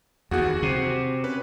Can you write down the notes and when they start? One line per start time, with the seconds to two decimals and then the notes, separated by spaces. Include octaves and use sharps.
0.31 D#2 F#4 G#4 F#5
0.62 C3
1.24 C#4 B4